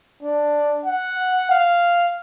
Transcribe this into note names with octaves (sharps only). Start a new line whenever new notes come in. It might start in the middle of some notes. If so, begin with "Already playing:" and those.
D4
F#5
F5